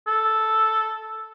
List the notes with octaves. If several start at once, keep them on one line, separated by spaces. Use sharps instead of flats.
A4